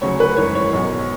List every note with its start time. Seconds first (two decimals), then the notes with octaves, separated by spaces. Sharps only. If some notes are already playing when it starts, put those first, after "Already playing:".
0.01 D2 C#3 F#3 C#5
0.20 B4
0.37 G#1 F#2 E3 C#5
0.55 C#5
0.73 B1 B2 F#3